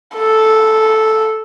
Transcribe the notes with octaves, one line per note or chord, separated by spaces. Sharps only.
A4